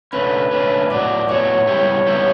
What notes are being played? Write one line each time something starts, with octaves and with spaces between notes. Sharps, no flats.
D3 A3 C#4 B4
D3 A3 C#4
A2 F#3 B3 F#4 D5
A2 F#3 B3 F#4 C#5
C#3 G3 B3 E4 G4
C#3 G3 B3 E4 G4